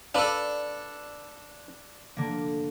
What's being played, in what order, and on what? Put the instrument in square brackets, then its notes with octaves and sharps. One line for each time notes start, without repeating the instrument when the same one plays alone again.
[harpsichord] D4 A4 [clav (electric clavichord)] B4 D5 F5
[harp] D3 A#3